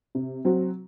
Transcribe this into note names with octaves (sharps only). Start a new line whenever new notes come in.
C3
F#3 C4 F#4